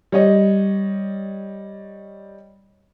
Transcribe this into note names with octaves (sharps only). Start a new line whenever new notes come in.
G3 C#5 D#5